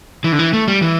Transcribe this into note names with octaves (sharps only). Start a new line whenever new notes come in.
E3
D3
E3
A3
G3
E3